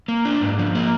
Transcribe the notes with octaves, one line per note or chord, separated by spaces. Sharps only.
A#3
D4
G#2
F3
A#3